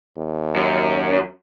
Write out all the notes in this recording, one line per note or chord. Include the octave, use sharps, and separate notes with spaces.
D#2
F#2